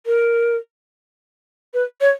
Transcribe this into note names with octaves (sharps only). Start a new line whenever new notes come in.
A#4
B4
C#5